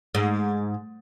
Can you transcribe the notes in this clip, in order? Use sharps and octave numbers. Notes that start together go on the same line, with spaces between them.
G#2